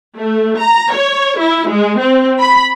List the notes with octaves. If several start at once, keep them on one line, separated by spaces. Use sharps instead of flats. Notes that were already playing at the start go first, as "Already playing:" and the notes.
A3
A#5
C#5
E4
G#3
C4
B5